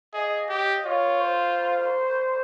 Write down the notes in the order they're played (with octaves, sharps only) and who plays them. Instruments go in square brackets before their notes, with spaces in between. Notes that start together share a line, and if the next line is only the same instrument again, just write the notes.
[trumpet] G#4 [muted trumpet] D#5
[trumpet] G4
[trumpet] F4 [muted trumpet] C#5
[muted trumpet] C5